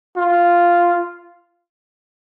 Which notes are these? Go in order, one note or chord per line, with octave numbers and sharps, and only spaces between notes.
F4